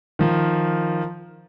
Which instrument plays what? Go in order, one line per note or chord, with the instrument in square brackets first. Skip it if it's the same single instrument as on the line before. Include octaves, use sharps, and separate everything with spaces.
[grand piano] D#3 F3